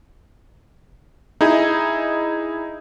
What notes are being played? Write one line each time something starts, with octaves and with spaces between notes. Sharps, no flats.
D#4 E4 G#4